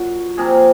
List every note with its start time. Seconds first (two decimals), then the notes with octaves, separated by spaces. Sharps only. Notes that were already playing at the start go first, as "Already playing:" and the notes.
Already playing: A#2 F#3 F#4
0.37 C3 F3 A#3 G#4